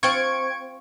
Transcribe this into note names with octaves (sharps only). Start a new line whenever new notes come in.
C4 F4 C#6 G#6 D7